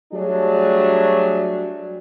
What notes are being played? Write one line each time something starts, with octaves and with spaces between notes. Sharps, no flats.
F#3 G3 A3 D4 G#4